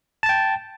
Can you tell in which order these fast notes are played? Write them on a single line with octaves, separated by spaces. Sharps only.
A5 A6 G5